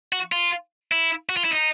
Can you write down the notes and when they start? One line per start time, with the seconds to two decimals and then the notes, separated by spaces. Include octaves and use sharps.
0.13 F#4
0.32 F4
0.92 E4
1.29 F#4
1.37 F4
1.44 E4
1.51 D#4